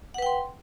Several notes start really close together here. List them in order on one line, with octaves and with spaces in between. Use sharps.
F#5 B4 G5 C6